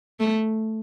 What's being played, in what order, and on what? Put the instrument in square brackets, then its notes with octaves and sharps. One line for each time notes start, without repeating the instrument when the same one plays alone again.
[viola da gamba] A3